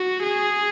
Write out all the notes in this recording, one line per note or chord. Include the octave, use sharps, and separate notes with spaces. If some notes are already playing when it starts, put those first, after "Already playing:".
Already playing: F#4
G#4